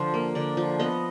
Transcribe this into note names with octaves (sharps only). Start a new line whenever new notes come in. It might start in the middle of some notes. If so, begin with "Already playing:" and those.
Already playing: D3 F3 C5
A#3
D3 D5
F3
B3 D#5